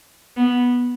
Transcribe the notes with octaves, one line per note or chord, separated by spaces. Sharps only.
B3